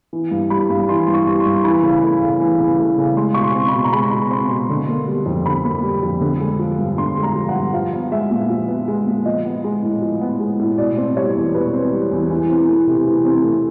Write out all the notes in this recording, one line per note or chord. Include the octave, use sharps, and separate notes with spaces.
E3
G2
G3 B5
G2
E3 C6
G2
C#6
G3
C6
G2
E3 B5
C#3
A3
C#3
E3
C#3
A3
C#3
G#3 C6
B2 C#6
C6
C4
B5
B2
A#5
G#3 B5
B2
C4 C6
B2
D3
A#3
G3
F2
D3 B5
A#3
G3
F2
D3
G#3
F3
G2
D3 C6
G#3
A#5
F3
F#5
G2
F3 F5
B3
G#3 E5
A#2
F3
B3
G#3
A#2
F3 D#5
B3
G#3
A2
F3
B3
G#3
A2
B2 D5
C4
G3 C#5
E2
B2 B4
C4
G3
E2
E3
C4
A3
C3
E3
C4
A3